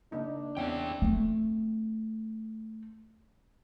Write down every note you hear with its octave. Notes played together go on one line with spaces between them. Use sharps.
C#3 A#3 D4 D#4
E2 C4 C#4 D5 E5 G5
A3 C4